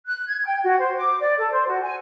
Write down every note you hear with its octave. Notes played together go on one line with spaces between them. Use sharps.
F#6
G#6
G5
F#4
C5
D6
D5
A4
C5
F#4
G#5